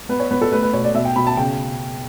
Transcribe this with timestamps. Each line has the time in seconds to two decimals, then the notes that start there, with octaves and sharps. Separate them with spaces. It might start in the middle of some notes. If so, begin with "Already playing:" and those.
0.09 B3 B4
0.20 C#5
0.31 B3 B4
0.42 A4
0.52 A3 B4
0.63 B4
0.73 B2 C#5
0.84 D5
0.94 B2 E5
1.05 G5
1.16 B2 B5
1.27 A5
1.37 C#3 G5